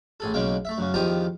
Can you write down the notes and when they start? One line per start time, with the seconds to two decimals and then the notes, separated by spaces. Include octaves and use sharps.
0.20 A1 G#4 A4
0.34 B1 C#3 G#3 A#3 G5
0.65 A3 E5
0.78 F#2 C#3
0.94 E2 D#3 F3 G4 A#5 D#6